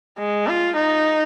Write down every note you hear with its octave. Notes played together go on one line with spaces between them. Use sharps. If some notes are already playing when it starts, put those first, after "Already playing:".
G#3
F4
D#4